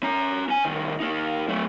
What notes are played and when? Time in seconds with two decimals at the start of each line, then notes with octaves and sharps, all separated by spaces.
0.03 C#4 A#5
0.49 C#4 G#5
0.64 C2 D#3
1.00 A#3 D#4
1.49 F#3 A3